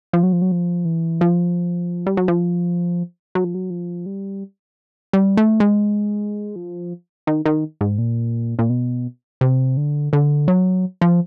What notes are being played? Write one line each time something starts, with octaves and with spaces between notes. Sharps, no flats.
F3
F#3
F3
F#3
F3
E3
F3
G3
F#3
F3
F#3
F3
F#3
F3
G3
G3
A3
G#3
F3
D#3
D#3
G#2
A#2
A#2
B2
C3
D3
D3
F#3
F3